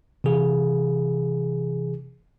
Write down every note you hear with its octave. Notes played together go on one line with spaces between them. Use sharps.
C3 E3 G#4